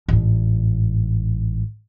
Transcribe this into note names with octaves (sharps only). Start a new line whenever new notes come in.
A1 G#2